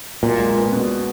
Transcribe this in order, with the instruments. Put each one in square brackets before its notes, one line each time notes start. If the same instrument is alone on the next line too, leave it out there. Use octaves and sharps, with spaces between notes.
[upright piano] B1 [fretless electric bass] A#2
[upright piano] G#3
B3
B2